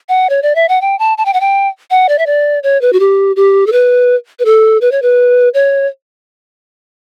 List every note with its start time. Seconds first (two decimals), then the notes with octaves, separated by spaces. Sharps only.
0.09 F#5
0.30 C#5
0.42 D5
0.55 E5
0.69 F#5
0.81 G5
0.99 A5
1.18 A5
1.25 G5
1.33 F#5
1.41 G5
1.90 F#5
2.09 D5
2.18 E5
2.26 D5
2.63 C#5
2.81 B4
2.93 F#4
3.00 G4
3.36 G4
3.67 A4
3.72 B4
4.39 B4
4.45 A4
4.81 B4
4.92 C#5
5.02 B4
5.54 C#5